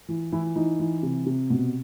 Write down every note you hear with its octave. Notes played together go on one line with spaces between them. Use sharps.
E3
E3 E4
E3 D#4
E3
C3
C3
B2